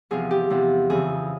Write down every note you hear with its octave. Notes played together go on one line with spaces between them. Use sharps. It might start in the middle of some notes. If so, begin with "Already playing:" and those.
E2 C3 F3 G#4
G4
E2 C3 F3
F2 C#3 E3 G#4